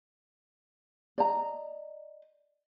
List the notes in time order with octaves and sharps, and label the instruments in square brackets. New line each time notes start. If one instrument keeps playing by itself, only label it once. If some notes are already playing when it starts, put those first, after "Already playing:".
[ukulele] D5 D#5 A#5